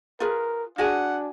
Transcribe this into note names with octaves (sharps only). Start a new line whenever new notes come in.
F4 G#4 A#4 B4
D4 F#4 G#4 F#5 G#5